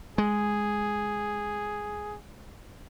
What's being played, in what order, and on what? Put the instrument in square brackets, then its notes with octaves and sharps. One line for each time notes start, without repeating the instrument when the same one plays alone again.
[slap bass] G#3 [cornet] G#4